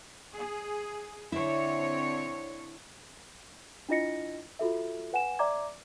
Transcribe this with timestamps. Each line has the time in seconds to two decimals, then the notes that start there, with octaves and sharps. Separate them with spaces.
0.35 G#4
1.32 D3 C4 E4 C#5
3.89 D4 E4 F4 D#5 A#6 C#7
4.59 F4 F#4 A4 E5
5.13 B4 F#5 G#5 E7
5.39 D5 E5 A#5 D6 G#6